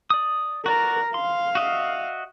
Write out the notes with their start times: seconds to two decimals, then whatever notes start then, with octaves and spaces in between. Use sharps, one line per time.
0.10 D5 D#6
0.66 F#4 A#4 D5 A#5
1.14 F5 C6
1.55 F#4 D#5 E5